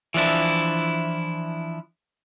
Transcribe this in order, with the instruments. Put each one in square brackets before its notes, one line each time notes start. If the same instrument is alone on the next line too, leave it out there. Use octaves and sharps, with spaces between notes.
[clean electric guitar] E3 F3 D4 E4